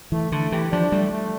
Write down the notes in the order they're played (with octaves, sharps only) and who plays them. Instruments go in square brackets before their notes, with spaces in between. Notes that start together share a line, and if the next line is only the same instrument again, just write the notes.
[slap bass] E3 [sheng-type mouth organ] A3
[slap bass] D3 [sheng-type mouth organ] A3
[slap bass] E3 [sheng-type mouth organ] G4
[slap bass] F3 [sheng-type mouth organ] D4
[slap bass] G3 [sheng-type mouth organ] A3
[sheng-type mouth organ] A3